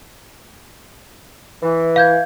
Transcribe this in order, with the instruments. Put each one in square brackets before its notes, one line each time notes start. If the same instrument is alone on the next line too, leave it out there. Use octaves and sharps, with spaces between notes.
[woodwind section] E3
[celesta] F5 G6 G#6